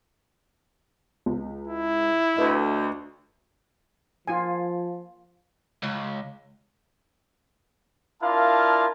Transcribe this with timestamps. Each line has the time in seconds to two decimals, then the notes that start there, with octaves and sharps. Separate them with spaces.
1.26 C#2
1.68 E4
2.37 D2 A4 B4 D#5
4.27 F3 F4 G#5
5.83 C#2
8.22 D4 E4 F4 A#4 F5 A5